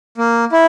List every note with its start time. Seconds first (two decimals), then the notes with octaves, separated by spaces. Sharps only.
0.18 A#3
0.52 E4